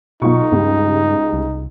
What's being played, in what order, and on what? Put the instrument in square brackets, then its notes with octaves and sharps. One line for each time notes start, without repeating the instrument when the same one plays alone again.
[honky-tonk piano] B1 F4 C#6 [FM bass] B2 [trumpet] D#4
[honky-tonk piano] C#2 G4 [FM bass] G2
[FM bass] C2